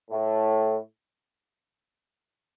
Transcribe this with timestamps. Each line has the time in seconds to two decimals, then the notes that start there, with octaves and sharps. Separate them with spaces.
0.10 A2